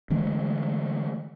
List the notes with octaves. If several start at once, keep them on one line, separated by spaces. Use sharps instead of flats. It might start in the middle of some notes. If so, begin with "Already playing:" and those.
D3 E3 G#3 A3